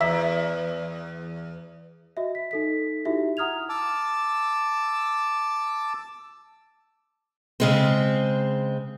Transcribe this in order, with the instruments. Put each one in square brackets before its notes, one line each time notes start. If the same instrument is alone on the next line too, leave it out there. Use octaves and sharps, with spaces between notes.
[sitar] E2 [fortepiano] E5
[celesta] F#4 D#5 E5
B6
D#4 A4 B6
D#4 E4 F#4 G4 E5
F#5 A#5 D#6 F6 G#6 F7
[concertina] A5 D6 E6
[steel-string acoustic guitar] C#3 G#3 C4